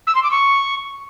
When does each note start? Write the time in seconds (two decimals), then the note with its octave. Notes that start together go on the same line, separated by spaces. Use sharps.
0.07 E6
0.15 C6
0.23 D6
0.31 C#6